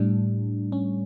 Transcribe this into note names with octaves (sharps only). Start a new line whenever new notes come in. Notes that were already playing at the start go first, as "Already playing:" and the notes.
Already playing: A2 G3 D4
C#4